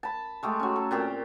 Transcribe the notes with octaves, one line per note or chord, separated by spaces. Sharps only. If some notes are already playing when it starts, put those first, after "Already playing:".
A5 B5
G#3 A3 G4
F#3 C#4
A4
A#2 C4 G4